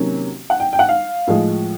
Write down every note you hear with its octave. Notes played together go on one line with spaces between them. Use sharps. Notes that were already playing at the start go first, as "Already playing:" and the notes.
Already playing: C3 D#3 F#3 A#3 C#4
F#5
G5
G5
F#5
F5
A2 F3 G#3